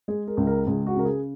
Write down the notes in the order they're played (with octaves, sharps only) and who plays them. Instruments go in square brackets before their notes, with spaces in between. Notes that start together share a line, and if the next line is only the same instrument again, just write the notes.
[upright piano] G#3 G#4
A#4
C#2
A#4
C#2 G#4
F#4
C#3 A#4
G#4